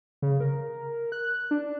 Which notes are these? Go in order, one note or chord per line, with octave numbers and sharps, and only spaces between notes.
C#3
A#4
F#6
D4